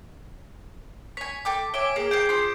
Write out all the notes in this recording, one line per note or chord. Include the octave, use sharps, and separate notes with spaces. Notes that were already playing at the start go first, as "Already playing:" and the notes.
C#5 G#5 B6
A4 G5 D6
C#5 E5 G#5 D6 D7 G7
A#3 G#4
C5 F5 G5 G6 D7
F4 C5